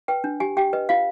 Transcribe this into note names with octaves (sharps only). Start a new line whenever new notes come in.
B4 G5
D4
G4 G#5
G4 G5
B4 D#5
F4 F5